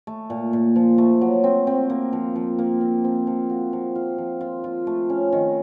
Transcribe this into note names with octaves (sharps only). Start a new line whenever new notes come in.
A3
A#2
A#2
F3
A3
F#3
C4
C4
A#3
F3
F3
A#3
C4
C4
F3
F#4
F3
F4
F3
F4
F4
A3
C#4
D#3